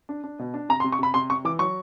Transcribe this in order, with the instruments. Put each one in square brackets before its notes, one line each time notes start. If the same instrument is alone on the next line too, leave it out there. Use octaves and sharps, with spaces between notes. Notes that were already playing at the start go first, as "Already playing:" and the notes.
[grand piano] D4
D4
B2
D4
C3 A#5
C6
C3
C#6
C3 B5
C3 C6
C3 C#6
E3 D6
F#3 C#6